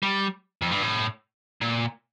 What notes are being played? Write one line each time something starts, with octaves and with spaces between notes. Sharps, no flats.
G3
F2
G2
A2
A#2